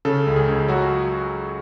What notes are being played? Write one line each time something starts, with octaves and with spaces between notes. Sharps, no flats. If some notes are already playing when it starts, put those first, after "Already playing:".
C#3 A4
C#2
G#4
C#2
F#3 F#4